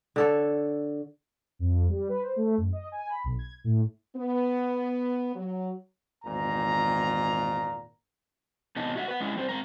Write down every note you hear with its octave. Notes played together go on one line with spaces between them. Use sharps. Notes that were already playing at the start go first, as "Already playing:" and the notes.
D3 A4 C#5
F2
G3
B4
C5
A3
F#2
D#5
G#5
B5
B1
G#6
A2
B3
F#3
G#1 E2 A#2 A#5
E2 C3 B3 D#4 D#5 A5
F#4 E5 F#5
B4 F#5
G#3 C#4 E4
G3 C4 C5
G#2 C4 A#4 A#5